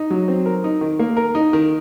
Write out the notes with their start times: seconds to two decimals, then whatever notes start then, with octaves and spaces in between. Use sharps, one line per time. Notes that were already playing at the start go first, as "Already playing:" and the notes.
Already playing: D#4
0.10 F#3
0.28 C4
0.46 A#4
0.64 D#4
0.81 D#3
0.99 A#3
1.17 A#4
1.35 D#4
1.53 D#3